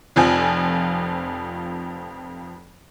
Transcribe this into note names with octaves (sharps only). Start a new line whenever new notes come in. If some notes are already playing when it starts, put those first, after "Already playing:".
F1 F2 F3 G#5